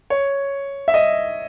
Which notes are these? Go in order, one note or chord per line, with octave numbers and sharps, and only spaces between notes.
C#5
E5
D#5